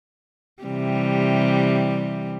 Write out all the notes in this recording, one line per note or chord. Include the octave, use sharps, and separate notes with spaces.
C3 E3 G3